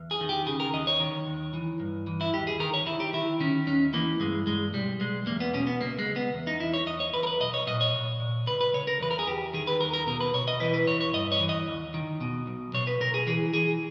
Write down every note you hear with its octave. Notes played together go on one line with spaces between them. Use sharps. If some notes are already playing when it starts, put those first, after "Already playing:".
Already playing: E2
G#4
D#3
G4
C#3 G#4
A#4
D#2 D#5
C#5
D#3
D#2
E3
G2
E3
E4
D#2 G4
G#4
D#3 A#4
C#5
D#3 E4
G4
D#3 E4
D#3 C#4
D#2 C#4
E3 A#3
G2 G#3
G2 G#3
B1 G3
B1 G#3
E2 A#3
B3
B2 C#4
B3
C#2 A#3
G#3
C#2
B3
E2
D#4
E2 E4
C#5
E2 D#5
C#5
E2 B4
A#4
B4
B1 D#5
C#5
A#2 D#5
C#5
A#2
A#2
C#2 B4
B4
C#3 C#5
A#4
E2 B4
A#4
G#4
E2 G4
D#3 G#4
B4
D#2 A#4
A#4
B2 A#4
B4
B2 C#5
D#5
E3 B4
B4
E2 C#5
C#5
G2 D#5
C#5
E3
D#5
D#2
D#3
B2
B1
B2 C#5
B4
B2 A#4
G#4
E3 G#4
E3 G#4